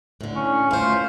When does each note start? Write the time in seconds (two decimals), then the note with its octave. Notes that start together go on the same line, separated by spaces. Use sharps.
0.21 A2 D3
0.35 C#4
0.71 A3 F4 C5